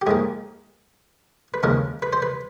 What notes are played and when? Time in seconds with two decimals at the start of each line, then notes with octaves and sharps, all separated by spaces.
0.02 G4
0.07 G#2 F3 A#3 G#4
1.54 B4
1.63 D#2 C#3 F3 G#3 A#4
2.02 B4
2.13 C5
2.22 B4